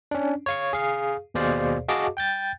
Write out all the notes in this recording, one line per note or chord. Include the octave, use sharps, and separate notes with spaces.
C#4 D4
C#5 F5 C#6
G#4 F5
D#2 B2 G#4 C5 D5 F5
F#4 G#4 D#5 F5 A5 D6
G5 G6 A6